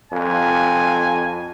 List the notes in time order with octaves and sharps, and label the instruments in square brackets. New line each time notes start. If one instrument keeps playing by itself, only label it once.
[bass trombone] F2 [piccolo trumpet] G#5